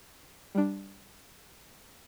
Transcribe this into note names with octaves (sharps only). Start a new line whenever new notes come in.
G3 D4